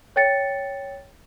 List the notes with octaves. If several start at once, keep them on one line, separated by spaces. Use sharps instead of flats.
C#5 G5 A6 C#7